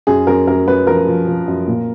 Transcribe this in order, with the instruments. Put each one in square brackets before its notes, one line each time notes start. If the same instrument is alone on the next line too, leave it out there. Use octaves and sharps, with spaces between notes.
[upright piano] F#2 G#4
F#2 A#4
F#2 A#4
F#2 B4
F3 A#4
F3
F3
F#2
A#2